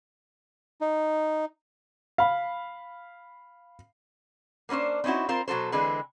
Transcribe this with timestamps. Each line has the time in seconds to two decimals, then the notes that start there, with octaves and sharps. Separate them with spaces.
0.81 D#4
2.18 F5 B5
4.69 A#3 B3 C#4 D4 C5
5.04 C4 C#4 D#4 E4 F#4
5.29 C4 F4 A#4 C5
5.48 B2 F#3 F#4 A4 C5
5.72 D3 E3 G#3 C4 B4